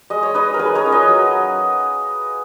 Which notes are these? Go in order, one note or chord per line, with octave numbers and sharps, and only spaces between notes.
G#3 D#5
C#5
D#4 B4 D#5
A#4
G#3 G#4 B4
A#4 C#5
C#4 F4
B4 D#5
F#3